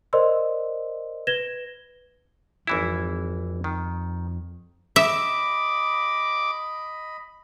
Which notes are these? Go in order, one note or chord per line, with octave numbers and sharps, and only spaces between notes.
A#4 C5 D5 D#5 C6 E6
B4 G#6 A#6 E7 G7
G#1 F2 E3 E4
D#3
D#5 E5 B5 D6